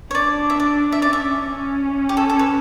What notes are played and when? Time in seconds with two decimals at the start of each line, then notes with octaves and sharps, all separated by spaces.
0.11 C#5
0.15 D4 D5
0.50 E5
0.60 D5
0.92 E5
1.02 C#4 D5
1.13 E5
1.50 C#4
2.09 G4
2.17 A4
2.30 A4
2.39 B4